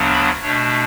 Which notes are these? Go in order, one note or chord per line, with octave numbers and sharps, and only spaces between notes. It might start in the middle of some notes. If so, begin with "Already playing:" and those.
Already playing: D2 C#3 F#3 B3 D4
B5
B2 A3 D4 C#5